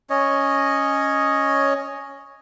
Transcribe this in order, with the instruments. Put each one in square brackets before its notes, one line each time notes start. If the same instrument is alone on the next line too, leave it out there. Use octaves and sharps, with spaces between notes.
[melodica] C#4 C#5 D#5